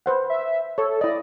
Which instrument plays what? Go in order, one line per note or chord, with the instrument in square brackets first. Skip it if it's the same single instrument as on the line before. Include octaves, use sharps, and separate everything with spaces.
[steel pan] B4 C5 F#5
[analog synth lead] E5
[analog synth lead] A4 [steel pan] C#5
[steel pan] E4 D#5 [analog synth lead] D5